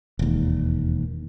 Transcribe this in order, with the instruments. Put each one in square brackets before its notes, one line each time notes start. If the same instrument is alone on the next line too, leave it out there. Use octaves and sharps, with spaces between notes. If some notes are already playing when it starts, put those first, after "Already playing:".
[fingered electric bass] E1 D#2